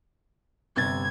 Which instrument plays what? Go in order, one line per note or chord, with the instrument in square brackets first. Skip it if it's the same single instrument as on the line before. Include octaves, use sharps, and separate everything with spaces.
[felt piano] G1 C3 A6 [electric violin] G#6